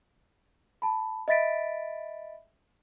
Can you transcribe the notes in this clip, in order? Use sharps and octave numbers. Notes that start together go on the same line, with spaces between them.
A5 B5
D#5 E5 B5 A6 B6 D7